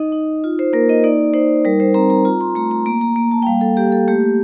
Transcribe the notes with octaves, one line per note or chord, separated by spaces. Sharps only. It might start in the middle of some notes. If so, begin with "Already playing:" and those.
Already playing: D#4 D#5
D#4
F4
C5
A#3 A#4
D#5
D#4 D5
D#4 C5
G3 A#4
C5
C4 A#5
A#5
F4 A#5
C6
A3 A#5
A#5
A#3 A#5
A#5
A#3 A#5
A5
G5
G3 F5
A4
A#3 G4
A4
A3 G4